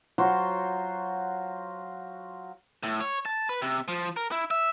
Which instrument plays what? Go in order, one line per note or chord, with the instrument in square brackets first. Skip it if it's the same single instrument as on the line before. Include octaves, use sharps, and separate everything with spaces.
[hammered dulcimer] F#3 F4 F#4 C5
[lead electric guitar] A2
C#5
A5
B4
C3
F3
A#4
E4
E5